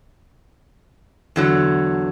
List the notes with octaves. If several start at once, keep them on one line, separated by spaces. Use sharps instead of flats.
E2 D3 F#3